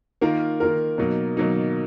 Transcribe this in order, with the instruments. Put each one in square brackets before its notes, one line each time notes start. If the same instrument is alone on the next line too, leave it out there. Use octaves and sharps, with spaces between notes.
[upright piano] D#3 A#3 F4 A#4
D#3 A#3 F4 A#4
B2 F#3 A#3 D#4
B2 F#3 A#3 D#4